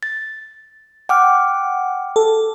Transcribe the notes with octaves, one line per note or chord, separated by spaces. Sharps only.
A6
F#5 G5 D6 F6
A4